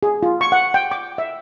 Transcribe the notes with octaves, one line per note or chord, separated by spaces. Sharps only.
G#4
F4
C#6
F#5
G5
D6
E5